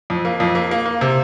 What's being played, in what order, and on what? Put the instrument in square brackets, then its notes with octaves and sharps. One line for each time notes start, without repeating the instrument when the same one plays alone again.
[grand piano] F2
A#3
F2
A#3
A#3
A#3
C3